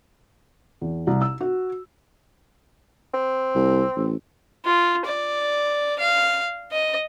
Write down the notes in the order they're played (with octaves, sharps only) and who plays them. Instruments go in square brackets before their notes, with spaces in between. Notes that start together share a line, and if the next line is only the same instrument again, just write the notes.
[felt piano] E2
C2
E6
F#4
[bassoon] C4
[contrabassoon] C2
A1
[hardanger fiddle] F4
D5
F5
D#5